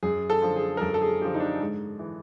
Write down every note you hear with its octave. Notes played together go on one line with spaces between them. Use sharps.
F#2 G#4
A4
D3 F3
G#4
A#4
F#2 A4
A4
G#4
D3 F3 G4
D#4
D4
G#2
E3